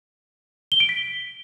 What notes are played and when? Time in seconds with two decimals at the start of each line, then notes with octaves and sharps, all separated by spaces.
0.72 G7
0.80 D7
0.89 B6